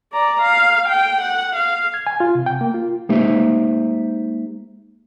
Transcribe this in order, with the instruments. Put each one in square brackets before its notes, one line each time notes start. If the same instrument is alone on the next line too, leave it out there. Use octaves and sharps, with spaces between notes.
[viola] D5 A#5
F5
G5
F#5
F5
[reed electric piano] G#6
G#5
F4
C3
G5
A#3
F4
[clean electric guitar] G#3 A#3 D#4 G4 C5 E5